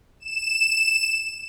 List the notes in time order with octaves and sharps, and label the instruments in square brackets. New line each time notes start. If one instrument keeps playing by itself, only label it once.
[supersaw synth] E7